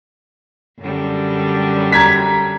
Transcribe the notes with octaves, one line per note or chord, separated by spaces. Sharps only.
F#2 D3 G3
A#5 G#6 B6